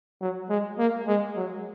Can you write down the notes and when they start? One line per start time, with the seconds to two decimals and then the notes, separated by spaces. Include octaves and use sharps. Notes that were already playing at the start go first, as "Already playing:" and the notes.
0.21 F#3
0.49 G#3
0.78 A#3
1.07 G#3
1.37 F#3